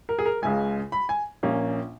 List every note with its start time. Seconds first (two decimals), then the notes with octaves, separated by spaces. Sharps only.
0.09 A#4
0.19 G#4
0.26 A#4
0.42 C#2 C#3 G#3 G#5
0.92 B5
1.09 G#5
1.43 A#1 A#2 A#3 C#4